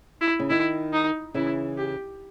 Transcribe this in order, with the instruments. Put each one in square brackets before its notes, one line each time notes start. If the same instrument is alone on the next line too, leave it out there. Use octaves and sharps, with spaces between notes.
[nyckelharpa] E4
[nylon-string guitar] C#3
[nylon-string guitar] D#3 [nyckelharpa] E4
[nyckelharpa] D#4
[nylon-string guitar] C#3 E3 [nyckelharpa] E4
[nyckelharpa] G4